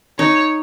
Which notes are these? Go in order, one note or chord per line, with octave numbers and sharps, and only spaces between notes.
D#4 C#5